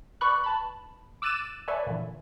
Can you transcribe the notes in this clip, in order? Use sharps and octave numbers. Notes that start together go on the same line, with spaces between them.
B4 D5 B5 C#6 F#6
B4 A5 B5
D6 E6 F#6 A6 D#7 E7
A4 B4 C#5 D5 E5 G#5
A#2 D3 E3